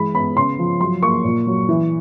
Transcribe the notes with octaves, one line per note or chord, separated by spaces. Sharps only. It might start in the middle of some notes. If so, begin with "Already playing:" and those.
Already playing: E3 G#3 B5
B3 B5
C#3 C6
F3
F#3 C6
A#3 C#6
A#2
F#3
E3